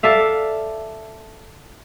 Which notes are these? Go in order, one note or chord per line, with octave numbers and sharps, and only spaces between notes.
A4 D5 E5 F5